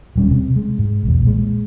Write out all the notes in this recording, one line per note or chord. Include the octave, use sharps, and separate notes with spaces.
D#1 G3 C#4
C3
G#3
G#2
B1 E2
A#2 G#3